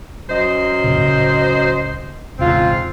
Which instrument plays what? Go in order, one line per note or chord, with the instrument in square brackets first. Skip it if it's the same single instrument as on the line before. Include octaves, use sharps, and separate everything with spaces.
[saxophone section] F#2 C5 D#5
[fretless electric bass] F2 A#2 C#3
C#2 A2 C#3
[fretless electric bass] E1 A1 C#3 [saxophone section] G#2 C4 F4